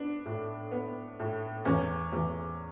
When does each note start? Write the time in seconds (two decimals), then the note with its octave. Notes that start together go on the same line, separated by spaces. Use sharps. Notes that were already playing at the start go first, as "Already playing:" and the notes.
Already playing: B3 D4
0.25 A2
0.71 B3
1.19 A2
1.65 E2 C#4
2.13 E2